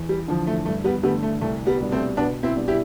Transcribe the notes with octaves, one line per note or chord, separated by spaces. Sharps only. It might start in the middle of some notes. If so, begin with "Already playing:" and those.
Already playing: E2
G3
D3 F3
A3
G2 A3
G3 B3
D3 G3 A3 B3
A3
C2 A3
G3 B3
B2 G3 B3 D4
A3 C4
B2 B3 D4
C4 E4
G3 B3 D4
E4 G4